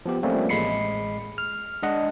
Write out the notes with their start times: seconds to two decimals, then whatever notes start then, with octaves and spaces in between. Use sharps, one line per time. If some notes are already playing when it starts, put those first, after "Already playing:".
0.06 F3 B3 G4
0.23 F3 G3 A3 A#3 C4 C#4
0.49 A1 G#3 B5 C7 C#7
1.38 F6
1.83 G#3 D4 D#5 F#5